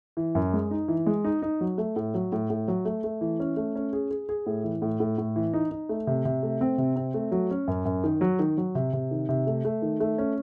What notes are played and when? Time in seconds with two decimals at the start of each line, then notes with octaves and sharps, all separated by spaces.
0.17 E3
0.35 F#2
0.53 G#3
0.71 D#4
0.88 E3
1.06 G#3
1.24 D#4
1.42 D#4
1.61 F#3
1.78 A3
1.96 A2
2.14 F#3
2.32 A2
2.50 A2
2.68 F#3
2.85 A3
3.04 A3
3.21 E3
3.40 C#4
3.57 A3
3.75 C#4
3.93 G#4
4.11 G#4
4.29 G#4
4.46 A2
4.64 E3
4.82 A2
5.00 A2
5.18 A2
5.36 E3
5.53 D#4
5.71 D#4
5.89 A3
6.07 C3
6.25 C3
6.43 A3
6.61 C4
6.78 C3
6.96 C4
7.14 A3
7.32 F#3
7.51 C#4
7.68 F#2
7.85 F#2
8.04 D#3
8.21 F#3
8.39 D#3
8.57 F#3
8.75 C3
8.93 C3
9.11 D#3
9.29 C3
9.47 A3
9.65 A3
9.82 D#3
10.00 A3
10.18 C#4